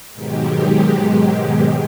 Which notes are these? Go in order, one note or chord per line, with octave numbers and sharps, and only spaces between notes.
G#2 B2 D#3 F#3 G#3 G4